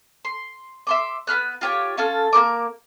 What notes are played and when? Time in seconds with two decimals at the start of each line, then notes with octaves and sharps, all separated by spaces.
0.25 C6
0.87 E5 C6 D6
1.27 B3 B5 F6 F#6
1.61 F4 G4 C#5
1.97 C#4 F4 A4 F6
2.33 A#3 C4 A#4 D6